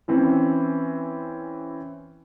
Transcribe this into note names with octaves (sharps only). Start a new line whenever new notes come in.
E3 C4 C#4 E4